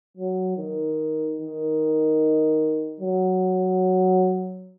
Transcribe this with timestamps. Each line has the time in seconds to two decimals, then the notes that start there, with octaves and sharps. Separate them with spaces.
0.17 F#3
0.57 D#3
1.39 D#3
3.00 F#3